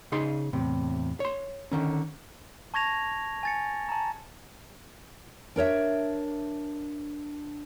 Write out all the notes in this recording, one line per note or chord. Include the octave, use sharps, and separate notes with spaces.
C#3 D#4 G#4 C6
E2 A2 C3
C#5 C6
D3 D#3 C#4
A5 C#6 G#6 A#6 F7
G#5 A6 C#7
A5 A#5
D4 A#4 C#5 E5